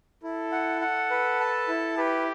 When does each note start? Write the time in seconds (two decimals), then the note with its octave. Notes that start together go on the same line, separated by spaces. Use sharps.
0.23 E4 A4
0.52 F#5
0.81 F#5
1.11 B4
1.40 A5
1.68 E4
1.97 G4 B4